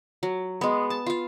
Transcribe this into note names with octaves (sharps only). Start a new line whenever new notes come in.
F#3
G#3 B3
A5
F4 F5